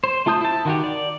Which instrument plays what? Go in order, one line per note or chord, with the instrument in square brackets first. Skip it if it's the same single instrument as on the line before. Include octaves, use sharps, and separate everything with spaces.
[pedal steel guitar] C5
A3 F4 A5 D#6 G6
E4 A5
D#3 F#4 G4
D5